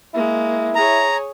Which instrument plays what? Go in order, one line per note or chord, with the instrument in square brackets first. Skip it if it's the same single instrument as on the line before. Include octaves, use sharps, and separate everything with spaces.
[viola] G#3 A#3 [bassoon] E4
[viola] G#4 C#5 [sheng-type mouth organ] A#5